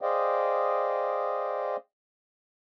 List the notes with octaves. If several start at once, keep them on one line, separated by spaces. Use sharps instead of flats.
G#4 C5 D5 D#5 F5 G5